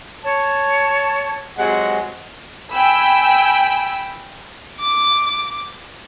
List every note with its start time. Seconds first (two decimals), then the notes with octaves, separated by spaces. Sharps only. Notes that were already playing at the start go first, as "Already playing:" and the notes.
0.25 C#5 A5
1.58 C3 F#3 G#3 F#5
2.71 G5 G#5 B5 E6
4.80 D6